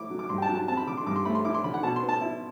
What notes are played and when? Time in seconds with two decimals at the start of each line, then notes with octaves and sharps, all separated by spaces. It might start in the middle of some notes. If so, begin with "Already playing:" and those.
Already playing: A3 E4 D6
0.10 F#3
0.19 D6
0.29 G2 C6
0.38 G5
0.42 A5
0.49 F#3
0.55 A5
0.68 C4 A5
0.77 B5
0.87 D3 D6
0.97 C6
1.06 G2 D6
1.16 C6
1.25 A3 B5
1.35 C6
1.44 E4 D6
1.54 C6
1.64 D3 B5
1.74 F#5
1.83 B2 A5
1.96 C6
2.03 B3
2.09 A5
2.21 E4